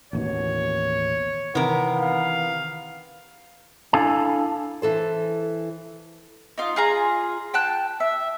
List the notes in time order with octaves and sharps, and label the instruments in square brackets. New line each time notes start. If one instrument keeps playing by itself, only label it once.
[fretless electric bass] A1 D#2 B2 [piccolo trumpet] C#5
[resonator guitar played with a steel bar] C3 A#4 [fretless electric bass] D#3 E3 [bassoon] B3
[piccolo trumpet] F5
[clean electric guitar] D4 E4 A4 F5 G#5 A5
[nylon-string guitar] E3 A4 C5
[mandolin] D#4 F4
F4 G#4 A#5
G5 A5 F#6
E5